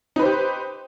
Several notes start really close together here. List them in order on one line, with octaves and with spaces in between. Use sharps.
D#4 B4 C5 G4